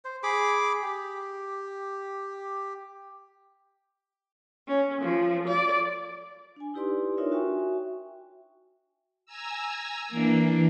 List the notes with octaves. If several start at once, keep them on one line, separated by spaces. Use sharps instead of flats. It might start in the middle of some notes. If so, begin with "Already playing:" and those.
C5
G#4 B5 D6
G4
C#4
F3
D5
D4 G#5
D#4 E4 G4 B4 D5 C6
D4 D#4 F4 A#4 C#5 E5
F#4 E5 G5 G#5 C#6
G#5 A#5 E6
E3 A#3 D4